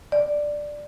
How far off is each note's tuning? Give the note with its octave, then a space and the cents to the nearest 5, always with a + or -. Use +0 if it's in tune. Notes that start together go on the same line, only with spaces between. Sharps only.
D5 +5